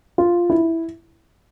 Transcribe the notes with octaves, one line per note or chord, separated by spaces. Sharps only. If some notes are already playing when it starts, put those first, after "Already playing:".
F4
E4